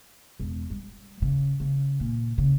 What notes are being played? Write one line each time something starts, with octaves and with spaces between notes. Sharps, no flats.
E1
G3
C#3
C#3
A#2
C#3